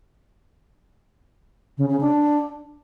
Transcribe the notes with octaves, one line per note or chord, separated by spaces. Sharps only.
C#3
C#3
D4